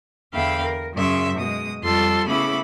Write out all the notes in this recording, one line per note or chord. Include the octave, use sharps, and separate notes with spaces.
E2 D3 E5 F5 G5 B5
A#4
F#2 C#3 F#3 E5 C6
B2 G#3 D#6
F2 G3 F4 A4 C6 A6
C#3 A3 B3 E4 B5 D6